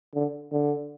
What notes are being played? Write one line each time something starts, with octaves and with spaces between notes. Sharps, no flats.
D3
D3